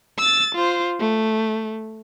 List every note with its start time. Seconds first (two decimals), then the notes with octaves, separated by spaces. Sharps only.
0.18 E6 A6
0.55 F4 C5
1.00 A3